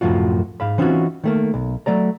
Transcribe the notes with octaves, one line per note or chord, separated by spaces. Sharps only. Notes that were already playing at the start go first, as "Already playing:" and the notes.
C2 F#2 A2 F3 F4 F#4
G#2 F5 B5
E3 C4 C#4 D#4 F4 F#4
D#3 A3 A#3
B1
F#3 A3 D5 A#5